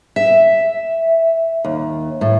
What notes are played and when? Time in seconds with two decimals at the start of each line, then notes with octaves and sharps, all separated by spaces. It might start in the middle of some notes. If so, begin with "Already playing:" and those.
0.16 E5
1.64 D#2
2.21 A2